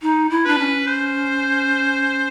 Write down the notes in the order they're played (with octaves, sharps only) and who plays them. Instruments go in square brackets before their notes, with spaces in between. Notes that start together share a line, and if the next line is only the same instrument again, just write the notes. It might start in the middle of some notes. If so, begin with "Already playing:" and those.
[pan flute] D#4
E4
[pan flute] D4 [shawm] B4
[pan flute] C#4
[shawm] C5